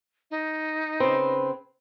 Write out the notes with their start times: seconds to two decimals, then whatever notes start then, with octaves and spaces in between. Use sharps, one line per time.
0.31 D#4
1.00 C#3 C4 B4